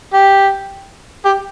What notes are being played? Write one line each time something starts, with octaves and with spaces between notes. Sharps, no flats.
G4
G4